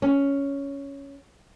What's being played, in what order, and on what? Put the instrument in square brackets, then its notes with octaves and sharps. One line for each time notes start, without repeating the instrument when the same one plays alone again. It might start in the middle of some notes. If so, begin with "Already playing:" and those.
[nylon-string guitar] C#4